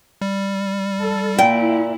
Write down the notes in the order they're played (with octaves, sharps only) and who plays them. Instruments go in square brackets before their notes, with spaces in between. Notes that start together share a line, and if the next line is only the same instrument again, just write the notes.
[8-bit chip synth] G3
[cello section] A4
[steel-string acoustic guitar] A#2 [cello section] A#3 E4 [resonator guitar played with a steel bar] G5